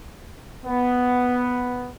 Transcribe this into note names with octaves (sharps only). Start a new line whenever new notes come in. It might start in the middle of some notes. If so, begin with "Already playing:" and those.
B3